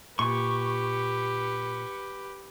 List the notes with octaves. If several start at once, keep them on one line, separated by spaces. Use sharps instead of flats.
A#2 G4 B4 C#6